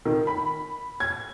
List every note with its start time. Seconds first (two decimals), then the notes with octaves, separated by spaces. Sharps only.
0.05 D#3
0.27 B5
1.00 G#6